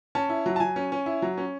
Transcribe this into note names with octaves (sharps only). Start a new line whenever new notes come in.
C#4 A5
E4
F#3
A5
F#3 G#5
C#4
C#4
E4
F#3
C#4